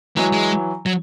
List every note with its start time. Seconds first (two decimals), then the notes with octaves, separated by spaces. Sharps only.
0.17 E3 F#3 G#3
0.33 G#3
0.86 F#3